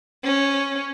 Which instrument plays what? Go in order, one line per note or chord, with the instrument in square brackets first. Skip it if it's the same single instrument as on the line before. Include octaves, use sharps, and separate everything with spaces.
[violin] C#4